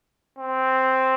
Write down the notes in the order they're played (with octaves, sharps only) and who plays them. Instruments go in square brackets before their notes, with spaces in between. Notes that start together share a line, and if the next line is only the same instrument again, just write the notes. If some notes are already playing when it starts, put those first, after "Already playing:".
[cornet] C4